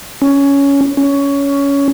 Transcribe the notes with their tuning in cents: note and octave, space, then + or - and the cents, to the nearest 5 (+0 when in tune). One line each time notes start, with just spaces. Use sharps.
C#4 +10
C#4 +15